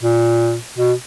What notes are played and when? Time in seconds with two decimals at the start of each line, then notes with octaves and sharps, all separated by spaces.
0.03 A#2
0.79 B2